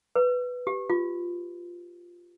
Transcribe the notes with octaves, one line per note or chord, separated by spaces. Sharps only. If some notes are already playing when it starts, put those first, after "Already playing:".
B4
G4
F4